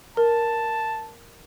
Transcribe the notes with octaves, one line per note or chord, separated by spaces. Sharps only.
A#4 A5